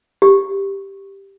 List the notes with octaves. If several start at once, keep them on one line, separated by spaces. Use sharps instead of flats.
G4